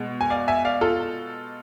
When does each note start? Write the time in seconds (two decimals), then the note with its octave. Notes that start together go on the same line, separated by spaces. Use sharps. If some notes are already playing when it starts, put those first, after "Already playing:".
Already playing: B2 G#3
0.21 G#5
0.30 D5 F5
0.48 E5 G#5
0.65 D5 F5
0.81 F4 A4